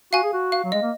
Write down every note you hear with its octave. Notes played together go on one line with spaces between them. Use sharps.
F#4 F5 G#5
G#4
F#4
F5
F#3
G#3 D#5
A#3